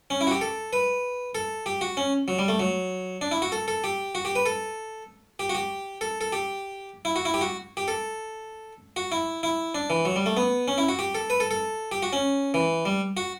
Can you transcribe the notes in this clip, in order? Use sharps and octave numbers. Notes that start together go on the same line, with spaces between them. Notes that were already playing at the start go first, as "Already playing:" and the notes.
C#4
E4
F#4
G4
A4
B4
A4
G4
F#4
C#4
F#3
G3
A3
F#3
D4
E4
F#4
A4
A4
G4
F#4
G4
B4
A4
G4
F#4
G4
A4
A4
G4
E4
F#4
E4
G4
F#4
G4
A4
F#4
E4
E4
D4
E3
F#3
G3
A3
B3
C#4
E4
F#4
G4
A4
B4
A4
A4
G4
F#4
C#4
E3
G3
F#4